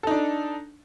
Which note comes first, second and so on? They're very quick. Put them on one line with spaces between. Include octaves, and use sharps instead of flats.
A4 D#4 D4